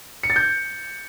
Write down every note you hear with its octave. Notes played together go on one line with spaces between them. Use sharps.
C#7
A6
G6